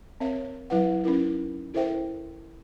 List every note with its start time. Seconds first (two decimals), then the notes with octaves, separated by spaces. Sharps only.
0.20 C4 A#4 C#5 E5 F5
0.70 F#3 E4 B4 F#5
1.04 C#4 D#4 E4 A#4
1.74 E4 A4 A#4 C5 E5 G5